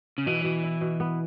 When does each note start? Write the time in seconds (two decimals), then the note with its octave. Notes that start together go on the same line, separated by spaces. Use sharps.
0.18 C#3
0.26 B2 E3
0.44 B2
0.64 E4
0.81 B2
1.00 B3